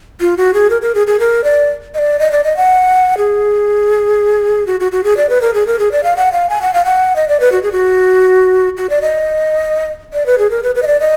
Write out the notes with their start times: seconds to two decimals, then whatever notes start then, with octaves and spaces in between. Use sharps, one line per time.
0.20 F4
0.37 F#4
0.54 G#4
0.70 A#4
0.82 A#4
0.95 G#4
1.07 G#4
1.20 A#4
1.44 D5
1.94 D#5
1.98 D5
2.19 D#5
2.32 D5
2.44 D#5
2.57 F#5
3.18 G#4
4.67 F#4
4.80 F#4
4.92 F#4
5.04 G#4
5.17 D5
5.29 B4
5.41 A#4
5.54 G#4
5.67 A#4
5.79 G#4
5.92 D5
6.04 F5
6.17 F#5
6.32 F5
6.50 G#5
6.62 F#5
6.74 F5
6.85 F#5
7.16 D#5
7.28 D5
7.40 B4
7.52 F#4
7.63 G#4
7.72 F#4
8.77 F#4
8.90 D5
9.02 D#5
10.13 D5
10.26 B4
10.38 G#4
10.50 A#4
10.63 B4
10.75 B4
10.83 D#5
10.87 D5
11.00 D#5